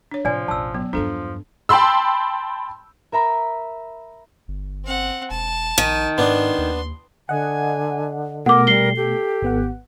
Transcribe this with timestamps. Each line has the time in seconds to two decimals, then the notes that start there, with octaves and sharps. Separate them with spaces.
0.11 D4 C#5
0.25 A2 C3 F3 D5 G#5
0.48 E1 A1 A5 E6
0.74 F#3 B3
0.93 E2 G2 F3 D4 A4 C6
1.69 G5 A5 B5 C6 E6
3.12 A#4 E5 A#5 B5
4.48 G1
4.85 C4 F#5
5.30 E1 A5
5.78 A#1 D#3 G#5
6.18 G#2 B3 D4 C6
6.58 D#2
7.29 D3 D#5 F#5 G#5
8.46 B2 A3 A#4 F#5 D6
8.67 G3 C7 G7
8.96 G4 A4
9.42 G#1 B3 F#5